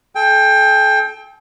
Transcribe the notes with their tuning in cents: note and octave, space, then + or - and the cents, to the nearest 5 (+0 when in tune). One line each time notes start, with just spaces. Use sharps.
A4 -35 G5 +20